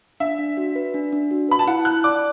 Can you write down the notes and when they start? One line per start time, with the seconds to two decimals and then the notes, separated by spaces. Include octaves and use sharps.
0.20 D4 E5
0.39 D4
0.57 F#4
0.76 B4
0.94 D4
1.13 D4
1.31 F#4
1.49 B4 B5
1.59 A5
1.67 E4 F#5
1.85 A5 F#6
2.04 D5 D6